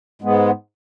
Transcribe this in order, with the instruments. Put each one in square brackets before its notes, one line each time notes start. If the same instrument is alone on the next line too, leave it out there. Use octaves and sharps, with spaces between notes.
[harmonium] G#2 G#3 B3